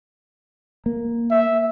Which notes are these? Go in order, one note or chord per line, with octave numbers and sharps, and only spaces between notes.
A#3
E5